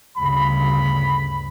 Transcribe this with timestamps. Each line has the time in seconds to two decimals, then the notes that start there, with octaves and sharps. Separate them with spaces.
0.18 D2 G2 C#3 B5